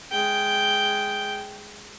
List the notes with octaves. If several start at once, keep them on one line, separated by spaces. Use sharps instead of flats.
G#3 G5